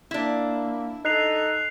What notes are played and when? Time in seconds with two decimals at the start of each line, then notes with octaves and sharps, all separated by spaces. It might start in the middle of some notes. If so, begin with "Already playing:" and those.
0.11 A#3 D4 E4
1.05 D#4 A4 F#6 C7 F7